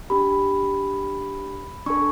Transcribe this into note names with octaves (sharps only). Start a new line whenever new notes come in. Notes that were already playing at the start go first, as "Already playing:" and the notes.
D4 G4 B5
D4 A4 C#6